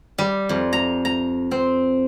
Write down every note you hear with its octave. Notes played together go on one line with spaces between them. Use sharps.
G3
F2
A#5
A#5
C4